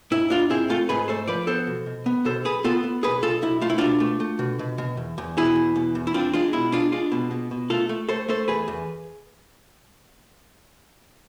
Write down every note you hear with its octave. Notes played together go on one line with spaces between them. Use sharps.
G#2 E4
G#2 D4 F4
C4 E4 G#4
A3 F4 A4
G#2 G#4 B4
A3 A4 C5
F3 B4 D5
B3 A4 C5
B2
B2
B3
B2 A4 C5
B1 G#4 B4
B3 F4 A4
B3
B1 G#4 B4
B1 F4 A4
B1 E4
A3 F4
E4
B2 D4 F4
A3
A3
B2
B2
B2
E2
E2
B2 E4 G#4
E2
B2
E2
E4
C4 D4 F4
G#3 D4 F4
B2 E4
G#3 D4 F4
G#3 D4 F4
B2
B2
B2
A3 F4 A4
A3
A3 A4 C5
A3 A4 C5
E2 G#4 B4
E2